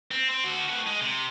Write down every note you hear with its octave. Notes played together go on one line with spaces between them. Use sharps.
C4
C4
D3 F#4
A2 F#4
G#3
C3